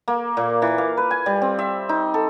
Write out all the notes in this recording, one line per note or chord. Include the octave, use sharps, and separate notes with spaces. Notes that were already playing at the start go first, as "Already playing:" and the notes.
A#3
A#2
E3
F5
B4
G#5
G3
C4
E5
D#4
A4